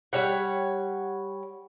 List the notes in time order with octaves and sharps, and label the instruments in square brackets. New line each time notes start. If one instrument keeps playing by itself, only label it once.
[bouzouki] G3 C#5 F#5